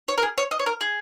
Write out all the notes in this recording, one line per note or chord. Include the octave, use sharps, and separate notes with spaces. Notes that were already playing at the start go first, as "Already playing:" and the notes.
C#5
A#4
G#4
C#5
D#5
C#5
A#4
G#4